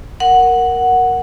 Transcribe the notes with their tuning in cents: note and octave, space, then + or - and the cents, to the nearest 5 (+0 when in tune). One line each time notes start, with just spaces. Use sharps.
A#4 +0 F#5 +0